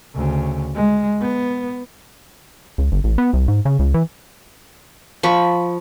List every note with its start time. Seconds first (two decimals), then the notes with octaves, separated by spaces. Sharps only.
0.15 D2 C#3
0.75 G#3
1.21 B3
2.78 C#2
2.92 G1
3.04 A1
3.18 B3
3.33 C2
3.48 G#2
3.65 C#3
3.79 C#2
3.94 E3
5.23 F3 B5 C#6